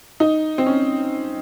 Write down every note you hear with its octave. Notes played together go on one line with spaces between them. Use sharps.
D#4
C4
C#4